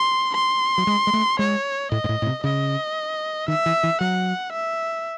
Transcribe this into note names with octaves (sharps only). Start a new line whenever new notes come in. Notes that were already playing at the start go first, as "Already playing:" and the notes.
Already playing: C6
C6
F#3
G#3
G#3
A3
G#3 C#5
A2 D#5
G#2
A2
A2
C3
C#3 D#5
D#3 E5
E3
E3
F#3 F#5
E5